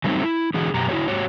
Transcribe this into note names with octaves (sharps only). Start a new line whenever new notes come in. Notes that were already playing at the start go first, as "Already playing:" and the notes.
F#3 G3 A3 C4 C#4 D#4
E4
D3 E3 F#4 G#4
F#2 B2 G4 A#5
E4 F#4 G4 B4 C#5
G#2 F#4 G4 C#5